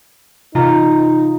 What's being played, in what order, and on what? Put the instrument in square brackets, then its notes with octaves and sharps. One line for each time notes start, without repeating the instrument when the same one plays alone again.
[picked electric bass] C3 E3 [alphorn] D#4 [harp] F4 A#5